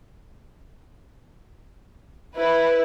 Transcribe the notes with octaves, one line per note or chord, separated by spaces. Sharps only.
E4 B4